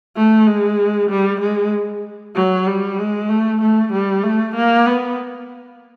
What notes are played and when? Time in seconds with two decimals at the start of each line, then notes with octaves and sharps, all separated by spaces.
0.16 A3
0.47 G#3
1.10 G3
1.41 G#3
2.35 F#3
2.67 G3
2.99 G#3
3.29 A3
3.61 A3
3.93 G3
4.23 A3
4.56 A#3
4.86 B3